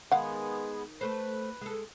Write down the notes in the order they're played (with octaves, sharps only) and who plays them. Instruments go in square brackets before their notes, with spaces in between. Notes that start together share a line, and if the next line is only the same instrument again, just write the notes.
[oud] D#3 [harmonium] G#3 B3 G#4 [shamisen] F5 F#5
[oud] A3 C5 [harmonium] B4
[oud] G#3 A4